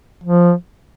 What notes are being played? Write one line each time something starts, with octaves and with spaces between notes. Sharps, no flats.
F3